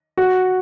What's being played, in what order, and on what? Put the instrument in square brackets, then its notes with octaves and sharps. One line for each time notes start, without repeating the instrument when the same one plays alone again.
[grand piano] F#4